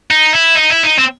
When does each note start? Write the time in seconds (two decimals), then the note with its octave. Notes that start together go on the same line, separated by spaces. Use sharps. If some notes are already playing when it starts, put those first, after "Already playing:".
0.11 D#4
0.33 E4
0.55 D#4
0.70 E4
0.84 D#4
0.99 C4